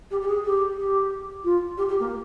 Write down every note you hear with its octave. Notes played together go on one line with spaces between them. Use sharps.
G4
G4
G#4
G4
G4
F4
G4
G4
A#3